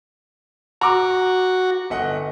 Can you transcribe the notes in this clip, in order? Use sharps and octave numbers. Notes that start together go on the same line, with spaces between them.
F#4 A#5 D6
G1 D#5 F#5